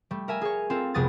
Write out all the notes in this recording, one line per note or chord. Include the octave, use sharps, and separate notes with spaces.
G3 A3
A#4 E5 G#5
G#4 C#5
C4 F4 A4 A#4
F1 C2 B3 G#4 D#6 A6